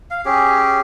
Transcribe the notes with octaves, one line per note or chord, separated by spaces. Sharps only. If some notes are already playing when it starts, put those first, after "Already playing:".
F5
C#4 G4 G#4